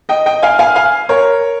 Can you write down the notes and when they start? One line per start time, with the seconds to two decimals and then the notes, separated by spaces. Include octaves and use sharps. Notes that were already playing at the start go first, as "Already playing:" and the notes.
0.09 D#5 G5
0.26 D#5 G5
0.43 F5 G#5
0.59 F5 G#5
0.76 F5 G#5
1.09 A#4 C#5